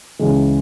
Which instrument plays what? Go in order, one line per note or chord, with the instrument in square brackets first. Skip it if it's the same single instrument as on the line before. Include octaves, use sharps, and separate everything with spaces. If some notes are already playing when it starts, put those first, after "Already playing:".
[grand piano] C#2 C#3 E3 G#3